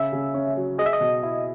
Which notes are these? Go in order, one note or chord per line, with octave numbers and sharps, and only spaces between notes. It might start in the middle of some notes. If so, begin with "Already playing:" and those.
Already playing: C#3 E5
C#3
C#4
F#3
G#4 D#5
E5
D#5
B2
E4